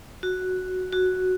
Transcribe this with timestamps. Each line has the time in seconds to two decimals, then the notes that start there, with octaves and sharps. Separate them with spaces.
0.23 F#4
0.92 F#4